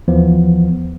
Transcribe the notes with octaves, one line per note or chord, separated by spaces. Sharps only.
D#2 E3 F3 B3